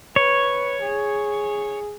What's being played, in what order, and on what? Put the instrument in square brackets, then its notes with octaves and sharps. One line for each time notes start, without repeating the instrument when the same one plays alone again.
[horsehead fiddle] B4 [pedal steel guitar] C#5
[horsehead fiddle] G#4